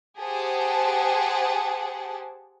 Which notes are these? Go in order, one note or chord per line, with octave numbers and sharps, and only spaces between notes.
G4 G#4 C5 F#5 G5 A5